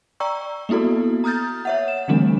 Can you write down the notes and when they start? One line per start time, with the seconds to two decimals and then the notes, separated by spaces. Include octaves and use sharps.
0.20 D5 G5 A#5 C#6 E6
0.69 A#3 B3 E4 F#4 A4
1.24 A#5 D#6 F6 G6 A6
1.65 C#5 E5 F#5
1.88 E7
2.08 D3 E3 G3 A3 C4 D4